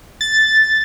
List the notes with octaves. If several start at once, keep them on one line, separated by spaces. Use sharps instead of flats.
A6